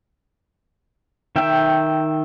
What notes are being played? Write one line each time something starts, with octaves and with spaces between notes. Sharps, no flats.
D#3 E5 G5